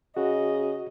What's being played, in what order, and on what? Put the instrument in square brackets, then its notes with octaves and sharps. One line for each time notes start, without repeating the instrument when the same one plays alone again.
[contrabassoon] C#3 [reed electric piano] F#4 [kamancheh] D#5